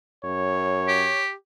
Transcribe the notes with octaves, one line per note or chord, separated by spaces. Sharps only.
F#2 C#5
G4